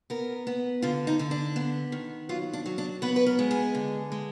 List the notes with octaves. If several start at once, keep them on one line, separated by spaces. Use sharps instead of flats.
B3 A#4
B3
D3 F4
D#4
D3
D4
B3
D#3
F#3 F4
D4
F#3
D4
B3 B4
B4
A#4
G#3
G#4
D3
G#3